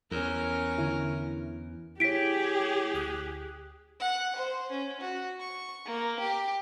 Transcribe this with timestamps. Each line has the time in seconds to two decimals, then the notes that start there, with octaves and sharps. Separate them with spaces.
0.11 E2 C#4 A#4
0.78 D3 E4
2.00 E4 G4 G#4 C#5 B6 D7
2.94 D2 D#6 F#6
4.00 F#5
4.36 C5
4.71 C#4
5.01 F#4
5.40 C#6
5.85 A#3
6.19 G4